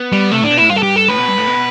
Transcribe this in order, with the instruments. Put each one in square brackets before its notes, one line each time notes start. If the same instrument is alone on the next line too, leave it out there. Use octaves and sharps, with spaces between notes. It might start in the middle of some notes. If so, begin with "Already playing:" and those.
Already playing: [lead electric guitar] B3
[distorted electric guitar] G3
[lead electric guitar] C3 [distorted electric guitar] A3
[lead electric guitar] A2 [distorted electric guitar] D4
[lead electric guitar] B2
[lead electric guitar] A2 [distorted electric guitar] E4
[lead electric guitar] G2 [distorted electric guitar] F4
[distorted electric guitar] A4
G4
A4
[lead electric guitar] A2 [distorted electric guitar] B4
[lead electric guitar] B2
G2
A2
B2